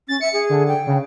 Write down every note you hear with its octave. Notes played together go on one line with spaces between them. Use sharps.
C#4 A6
E5 C#7
G#4
D3
G5
C#3